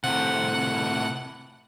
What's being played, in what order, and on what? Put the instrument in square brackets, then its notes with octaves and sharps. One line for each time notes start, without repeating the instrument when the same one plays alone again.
[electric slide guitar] A2 C3 [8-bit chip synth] F#5